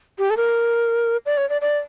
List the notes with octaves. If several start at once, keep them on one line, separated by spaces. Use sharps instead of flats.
G4
A4
A#4
D5
C#5
D5
D5